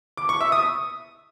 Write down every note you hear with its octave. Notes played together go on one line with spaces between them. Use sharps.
D6
C#6
E5
D#6